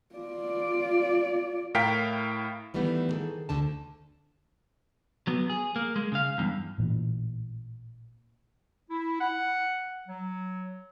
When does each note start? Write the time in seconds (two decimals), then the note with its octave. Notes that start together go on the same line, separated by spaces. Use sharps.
0.15 F4 D5
1.74 A2 E4 A#4 F5 G5 B6
2.74 D#3 E3 G3 A3 B3
3.09 D#3 G#4 A4
3.49 D2 D3 A5
5.27 F#3 B3
5.50 G#4
5.76 A#3
5.96 G#3
6.12 C#3 F5
6.38 E2 G2
6.78 A1 A#2 E3
8.90 E4
9.21 F#5
10.08 F#3